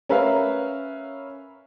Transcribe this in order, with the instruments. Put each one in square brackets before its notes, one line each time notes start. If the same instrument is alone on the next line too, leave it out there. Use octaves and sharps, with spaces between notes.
[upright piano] C#4 A#4 B4 E5 F5